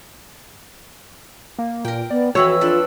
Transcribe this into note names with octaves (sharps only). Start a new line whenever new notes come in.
A#3
A#2 A#4 G5
B3 D5
F2 E3 F#4 C#5 B5 E6
D4 F4 A4 B4